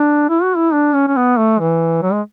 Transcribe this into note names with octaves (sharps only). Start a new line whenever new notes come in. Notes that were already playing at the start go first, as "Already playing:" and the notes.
Already playing: D4
E4
F#4
E4
D4
C#4
C#4
B3
A3
E3
F#3
G#3